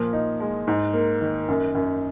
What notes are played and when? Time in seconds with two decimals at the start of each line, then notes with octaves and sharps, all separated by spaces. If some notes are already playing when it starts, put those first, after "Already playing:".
Already playing: A#2 F3
0.13 D#4
0.40 G#3
0.67 G#2
0.93 A#3
1.21 D#3
1.49 F#2
1.75 F#2